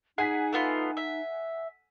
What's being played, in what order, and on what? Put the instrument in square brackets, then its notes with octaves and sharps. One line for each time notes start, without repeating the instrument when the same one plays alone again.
[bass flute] D#4 [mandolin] G#4 [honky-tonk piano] F#5 G#5 B6
[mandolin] A3 B3 F4
E5